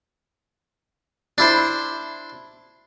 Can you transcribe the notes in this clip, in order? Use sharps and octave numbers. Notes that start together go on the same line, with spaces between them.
D4 E4 C5